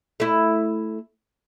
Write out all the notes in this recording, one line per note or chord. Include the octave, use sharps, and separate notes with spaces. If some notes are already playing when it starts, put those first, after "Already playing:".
A3 E4